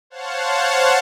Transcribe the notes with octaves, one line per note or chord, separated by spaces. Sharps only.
C5 C#5 F5 F#5 A5